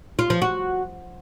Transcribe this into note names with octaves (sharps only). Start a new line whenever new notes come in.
F4
F3
F#4